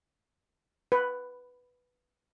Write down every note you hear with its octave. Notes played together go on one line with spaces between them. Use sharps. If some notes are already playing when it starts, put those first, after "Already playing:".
B4